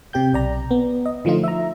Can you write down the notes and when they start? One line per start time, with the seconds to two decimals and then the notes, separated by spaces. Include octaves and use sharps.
0.13 C3 G4 G5 G6
0.33 B1 D5 A#5
0.71 B3
1.06 D#5
1.25 D3 F3 A3 D#4 F4
1.44 E5 A#5